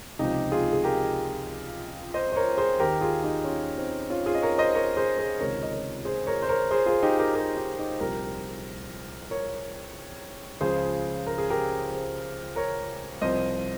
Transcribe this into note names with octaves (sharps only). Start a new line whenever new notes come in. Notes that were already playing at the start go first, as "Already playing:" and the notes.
C#2 C3 F3 D#4 G4
F4 G#4
G#4
G4 A#4
C5 D#5
C5
A#4 C#5
G#4 C5
D#2 D#3 G4 A#4
F4 G#4
D#4 G4
C#4 F4
C4 D#4
C#4 F4
F4 G#4
D#5
A#4 C#5
C5 D#5
A#4 C#5
G#4 C5
G#4 C5
C#2 C3 D#3 A#4 C#5
D#5
A#4 C#5
G#4 C5
A#4 C#5
C5
A#4 C#5
G#4 C5
F4 G#4
D#4 G4
G4 A#4
G4 A#4
D#4 G4
D#4 G4
C2 A#2 F3 G4 A#4
A#4 C#5
C#2 C#3 F3 G#4 C5
A#4
G#4
G4 A#4
G#4 C5
A#4 C#5
C2 C3 F3 C5 D#5